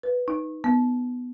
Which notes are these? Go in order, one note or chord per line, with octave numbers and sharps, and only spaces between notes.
B4
D#4
B3